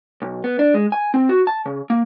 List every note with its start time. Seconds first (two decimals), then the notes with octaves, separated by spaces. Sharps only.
0.22 B1
0.44 B3
0.59 D4
0.74 G#3
0.92 G#5
1.14 C4
1.29 F#4
1.47 A5
1.66 C#3
1.90 A#3